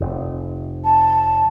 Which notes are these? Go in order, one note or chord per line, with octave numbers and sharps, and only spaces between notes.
F1
A5